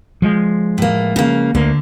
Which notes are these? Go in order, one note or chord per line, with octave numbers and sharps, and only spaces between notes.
F3 G#3
A2 A#3
C#3 A#3
D2 D3 A#3